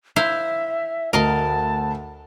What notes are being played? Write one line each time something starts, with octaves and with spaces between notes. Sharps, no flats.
E4 C5 E5 F5
D2 A#4 D#5 F5 A5